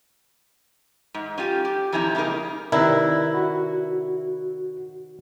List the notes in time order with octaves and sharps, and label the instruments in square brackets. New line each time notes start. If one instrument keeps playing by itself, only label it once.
[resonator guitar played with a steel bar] G#2
C#4 F4 G4
G4
F2 C3 C#4 E4 G#5 A#5
G#2 C#3 A#3 D#4 A#4
[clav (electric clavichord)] C3 D#3 B4 [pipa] E4 [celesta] A#4 D5 A#5
[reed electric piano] F#4